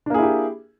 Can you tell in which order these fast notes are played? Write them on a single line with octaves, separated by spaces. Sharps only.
D4 A#3 G#4 E4 G4